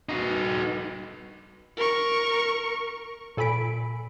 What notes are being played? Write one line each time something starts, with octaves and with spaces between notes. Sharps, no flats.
D#4 F#4
A#4 C#6
A#2 A4 G#5 B5 B6 D7